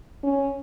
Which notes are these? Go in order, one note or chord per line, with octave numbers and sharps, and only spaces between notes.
C#4